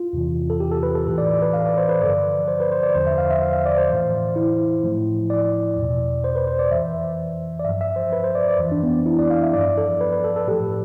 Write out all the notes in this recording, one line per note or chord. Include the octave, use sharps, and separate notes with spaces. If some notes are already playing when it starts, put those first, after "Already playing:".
Already playing: F4
E2 C3 E3
A4
G4
A4
B4
A4
A2 E3 A4
D5
D5
B4
F5
D5
C5
B4
G2 D3 F3 D5
C5
B4
C5
D5
E2 D3 F3 C5
E5
F5
E5
F5
F5
D5
C5
A2 E3
E4
A2 F3
D5
E2 B2
C5
B4
C5
D5
F2 E3 E5
D5
G2 F3 E5
E5
C5
B4
C5
D5
D5
F2 E3
D4
B3
E4
D5
F5
E5
G2 F3 D5
A4
B4
B4
A4
A4
A2 F3 G4